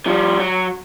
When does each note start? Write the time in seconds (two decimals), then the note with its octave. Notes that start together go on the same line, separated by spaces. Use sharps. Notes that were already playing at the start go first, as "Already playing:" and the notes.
0.06 F3 G3
0.40 F#3